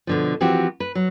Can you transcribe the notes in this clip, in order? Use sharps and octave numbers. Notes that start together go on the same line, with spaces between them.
B2 D3 F3
E3 F3 C4 F#4 G4
B4
F#3